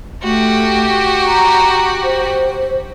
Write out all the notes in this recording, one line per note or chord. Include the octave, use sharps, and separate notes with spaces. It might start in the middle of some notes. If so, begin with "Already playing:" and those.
A3 F#4 G4
A#5
C5